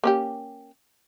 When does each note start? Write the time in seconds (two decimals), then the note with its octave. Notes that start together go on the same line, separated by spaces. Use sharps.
0.04 A#3 C#4 G4